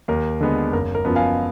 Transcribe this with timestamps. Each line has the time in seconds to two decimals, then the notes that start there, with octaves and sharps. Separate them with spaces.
0.08 D#2 A#4
0.41 D3 G#3 B3
0.73 F#1 A#4
0.95 A#4
1.05 F#2 F3 B3
1.15 F5 G#5